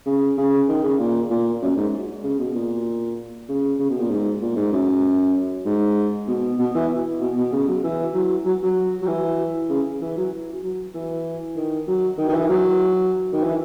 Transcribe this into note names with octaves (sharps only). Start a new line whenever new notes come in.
C#3
C#3
D#3
C#3
A#2
A#2
F#2
G#2
C#3
B2
A#2
C#3
C#3
B2
A#2
G#2
A#2
G#2
F#2
G#2
B2
B2
E3
B2
B2
C#3
F#3
E3
F#3
F#3
F#3
F#3
E3
C#3
E3
F#3
F#3
E3
D#3
F#3
D#3
D#3
E3
F#3
D#3
E3